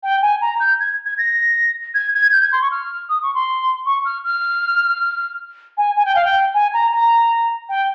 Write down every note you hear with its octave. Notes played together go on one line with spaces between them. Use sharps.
G5
G#5
A#5
G6
G#6
G#6
A#6
G#6
G#6
G6
G#6
C6
C#6
F6
D#6
C#6
C6
C#6
F6
F6
G#5
G#5
G5
F5
G5
G#5
A#5
A#5
G5